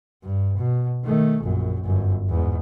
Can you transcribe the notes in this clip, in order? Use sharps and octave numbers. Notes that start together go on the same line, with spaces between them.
G2
B2
D#3 A3
A#1 F#2
G1 F#2
E2 G#2